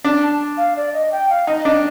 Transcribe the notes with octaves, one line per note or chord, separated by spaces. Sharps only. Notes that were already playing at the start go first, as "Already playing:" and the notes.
D4
A5
F5
D5
D#5
G5
F5
D#4 D#5
D4 D#5